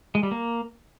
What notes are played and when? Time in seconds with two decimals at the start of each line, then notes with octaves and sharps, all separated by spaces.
0.15 G#3
0.23 G3
0.31 A#3